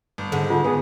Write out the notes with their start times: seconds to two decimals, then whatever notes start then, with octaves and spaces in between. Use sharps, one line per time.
0.18 G1
0.32 G#2 D3
0.50 D3 F4
0.64 B3 G#4